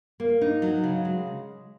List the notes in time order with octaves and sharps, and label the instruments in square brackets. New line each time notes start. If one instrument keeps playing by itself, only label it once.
[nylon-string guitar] A#3
D#4
F#3
C#3
G#3